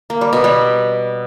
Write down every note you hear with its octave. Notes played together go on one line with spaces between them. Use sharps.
A#3
G3
B2
G3